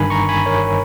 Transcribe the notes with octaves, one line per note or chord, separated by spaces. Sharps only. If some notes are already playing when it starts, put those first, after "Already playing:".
Already playing: G1 G2 D#3 G#5 B5
A#5 C#6
G#5 B5
A#4 C#5